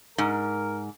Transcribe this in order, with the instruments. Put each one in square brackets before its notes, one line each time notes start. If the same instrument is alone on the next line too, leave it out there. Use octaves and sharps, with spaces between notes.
[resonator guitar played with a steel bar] G#2 [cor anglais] A#4